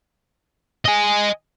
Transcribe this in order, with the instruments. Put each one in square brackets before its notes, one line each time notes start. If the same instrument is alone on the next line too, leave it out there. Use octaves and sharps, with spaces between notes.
[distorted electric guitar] D#5 G#5